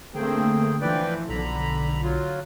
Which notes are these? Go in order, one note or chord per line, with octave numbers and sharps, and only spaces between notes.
D3 A3 A#3 C4 G#4 G5
E3 F3 B4 D5 G5
B1 D3 A#5 B5
F#3 F4